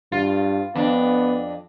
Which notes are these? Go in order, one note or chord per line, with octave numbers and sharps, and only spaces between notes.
G2 F4
F2 B3 D4